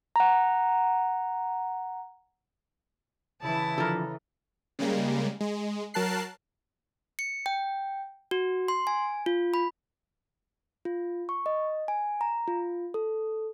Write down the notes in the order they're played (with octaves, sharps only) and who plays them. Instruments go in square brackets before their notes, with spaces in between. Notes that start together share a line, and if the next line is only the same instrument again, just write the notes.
[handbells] F#5 A#5
[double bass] C#3 E3 [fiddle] E4 A5
[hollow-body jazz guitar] D3 F3 [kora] A4 A#4
[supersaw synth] C#3 G3 G#3 A#3
G#3
F#3 A#4 A5 F#6 C7
[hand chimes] C#7
G5
F#4
C6
G#5
F4
B5
F4
C#6
D#5
G#5
A#5
F4
A4